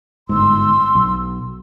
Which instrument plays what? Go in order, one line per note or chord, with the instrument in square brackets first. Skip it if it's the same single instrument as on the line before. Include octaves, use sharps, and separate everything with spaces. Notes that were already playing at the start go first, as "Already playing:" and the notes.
[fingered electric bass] G1 G#2 [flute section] C6 E6
[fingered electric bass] B1